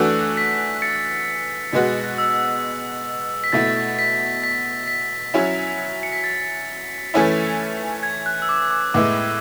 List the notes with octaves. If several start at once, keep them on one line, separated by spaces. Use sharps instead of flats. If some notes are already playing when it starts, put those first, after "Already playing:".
Already playing: E3 A3 D4 F#4 E6
B6
A6 C#7
B2 G#3 B3 F#4
E6
B6
B2 A3 E4 A6
B6
B6
B6
F#3 C#4 E4
C#7
B6
A6
E3 A3 C#4 E4
G#6
F#6
E6
D6
D6
A2 G#3 B3 E4 D6